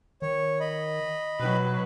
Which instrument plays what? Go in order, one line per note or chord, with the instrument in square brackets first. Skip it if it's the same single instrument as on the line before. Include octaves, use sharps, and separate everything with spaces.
[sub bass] D#3 [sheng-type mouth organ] C#5
[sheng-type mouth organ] D#5 B5
[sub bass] B2 [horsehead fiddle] F#3 B4